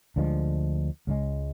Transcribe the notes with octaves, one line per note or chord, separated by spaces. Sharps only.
D2 D3 F3 G#3
C#2 C#3 E3 G#3